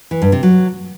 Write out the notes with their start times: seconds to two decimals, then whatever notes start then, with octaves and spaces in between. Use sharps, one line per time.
0.11 E3
0.22 G2
0.32 C3
0.43 F#3